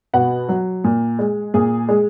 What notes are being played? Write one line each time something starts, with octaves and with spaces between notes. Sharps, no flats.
B2 F#4 F#5
F#3
A#2
G#3
A#2 G#4
G#3